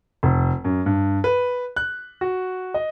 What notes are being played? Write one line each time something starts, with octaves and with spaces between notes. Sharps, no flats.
F1
F#2
G2
B4
F#6
F#4
D#5